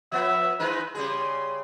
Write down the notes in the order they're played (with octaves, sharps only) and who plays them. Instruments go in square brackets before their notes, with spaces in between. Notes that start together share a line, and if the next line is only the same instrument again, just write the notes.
[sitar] F3 B3 [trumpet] E5
[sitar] E3 G#3 D#4 [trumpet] B4
[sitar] C#3 G3 G#4 [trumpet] C6